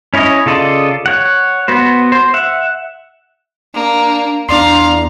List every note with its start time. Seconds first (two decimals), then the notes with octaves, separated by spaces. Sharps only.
0.14 C#4 E4 C#5 D#5
0.46 C#3 F4 A4 D5 D#5
1.06 C#5 F#5
1.68 B3 F#4 C5
2.12 C5
2.34 E5 F#5
3.74 A#3 D4
4.49 E2 D4 D5 F5 A#5 C6